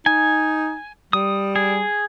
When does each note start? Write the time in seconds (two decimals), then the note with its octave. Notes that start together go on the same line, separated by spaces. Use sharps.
0.06 D#4 G#5
1.13 G3 D#6
1.56 G#4